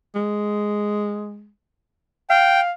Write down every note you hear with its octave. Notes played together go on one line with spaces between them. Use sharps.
G#3
F5 G5